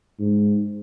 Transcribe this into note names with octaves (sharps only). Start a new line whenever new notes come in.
G#2